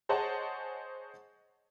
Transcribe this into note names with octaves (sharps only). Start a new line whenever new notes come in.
G#4 C5 C#5 D#5 F#5 A5